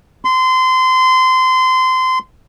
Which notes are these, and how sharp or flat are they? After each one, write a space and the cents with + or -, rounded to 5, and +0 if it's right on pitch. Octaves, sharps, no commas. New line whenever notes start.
C6 -25